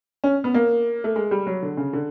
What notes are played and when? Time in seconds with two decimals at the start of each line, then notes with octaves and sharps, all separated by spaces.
0.24 C#4
0.44 B3
0.54 A#3
1.04 A3
1.16 G#3
1.31 G3
1.47 F#3
1.63 D3
1.77 C#3
1.93 D3